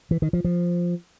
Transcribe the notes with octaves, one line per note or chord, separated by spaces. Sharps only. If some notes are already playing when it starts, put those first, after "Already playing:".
E3
D#3
F3
F3